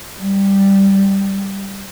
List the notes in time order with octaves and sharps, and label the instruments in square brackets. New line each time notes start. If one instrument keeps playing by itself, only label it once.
[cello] G3